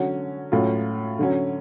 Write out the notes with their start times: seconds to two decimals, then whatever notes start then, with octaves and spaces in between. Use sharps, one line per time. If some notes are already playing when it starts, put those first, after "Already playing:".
Already playing: D3 F#3 C#4 F#4
0.52 A2 F#3 C#4 F4
1.19 D3 F#3 C#4